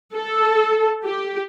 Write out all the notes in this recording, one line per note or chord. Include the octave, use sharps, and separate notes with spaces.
A4
G4